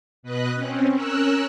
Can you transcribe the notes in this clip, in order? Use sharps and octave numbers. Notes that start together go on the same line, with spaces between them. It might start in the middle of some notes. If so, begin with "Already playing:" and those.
B2 B4 D#5 F#6
C4 C#4
C#4 A#4 E6 F#6